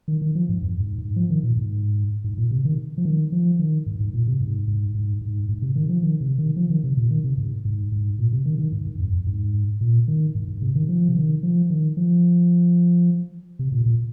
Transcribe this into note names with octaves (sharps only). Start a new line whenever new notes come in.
D#3
D#3
F3
G#2
F2
G#2
G#2
F3
D#3
A#2
G#2
G#2
A#2
C3
D#3
F3
D#3
F3
D#3
G#2
G#2
A#2
C3
G#2
G#2
G#2
G#2
G#2
C3
D#3
F3
D#3
C3
D#3
F3
D#3
C3
A#2
D#3
C3
G#2
G#2
G#2
A#2
C3
D#3
D#3
G#2
G#2
F2
F2
G#2
A#2
D#3
G#2
G#2
C3
D#3
F3
C3
D#3
F3
D#3
F3
C3
A#2
A#2